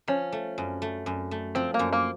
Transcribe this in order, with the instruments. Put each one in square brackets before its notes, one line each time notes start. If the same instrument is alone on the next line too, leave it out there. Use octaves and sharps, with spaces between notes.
[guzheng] F3 [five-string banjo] C#4
[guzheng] A3
F#2
A3
F#2
A3
[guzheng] F3 [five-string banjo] C4
[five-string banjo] A#3
[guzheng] F#2
[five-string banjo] A#3